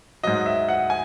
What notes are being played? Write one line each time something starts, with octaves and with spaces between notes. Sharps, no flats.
G#2 F#3 D#5
E5
F#5
G#5